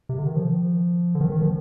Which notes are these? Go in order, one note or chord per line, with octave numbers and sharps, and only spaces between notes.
C3
D3
D#3
F3
D3
D#3
D#3
F3